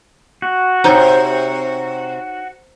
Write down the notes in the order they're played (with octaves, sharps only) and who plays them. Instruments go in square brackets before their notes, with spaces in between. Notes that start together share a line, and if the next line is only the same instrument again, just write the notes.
[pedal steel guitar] F#4
[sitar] F#2 C3 [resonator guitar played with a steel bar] D#4 C5 C#5